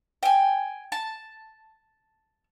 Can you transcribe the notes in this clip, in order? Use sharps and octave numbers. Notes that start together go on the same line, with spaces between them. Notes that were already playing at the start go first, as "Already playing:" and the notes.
G5 G#5
A5